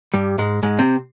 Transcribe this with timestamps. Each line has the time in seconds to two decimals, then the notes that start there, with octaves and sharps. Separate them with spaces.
0.14 G2 G3
0.38 G#2 G#3
0.63 G#2 G#3
0.79 C3 C4